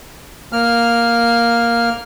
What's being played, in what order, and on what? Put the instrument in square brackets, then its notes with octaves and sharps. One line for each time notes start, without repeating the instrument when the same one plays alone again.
[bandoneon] A#3 F6